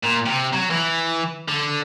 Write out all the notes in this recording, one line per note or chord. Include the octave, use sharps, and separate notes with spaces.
A#2
C3
F#3
E3
D3